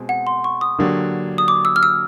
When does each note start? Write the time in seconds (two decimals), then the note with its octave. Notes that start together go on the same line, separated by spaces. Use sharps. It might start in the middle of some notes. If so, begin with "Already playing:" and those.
Already playing: B2 G#3 C4
0.09 F#5
0.27 C6
0.44 C#6
0.61 D#6
0.79 D3 F#3 A#3 D4 G4
1.38 D#6
1.48 D6
1.65 E6
1.76 F6
1.83 E6